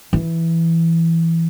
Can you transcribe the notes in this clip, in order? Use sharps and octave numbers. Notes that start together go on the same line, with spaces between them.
E3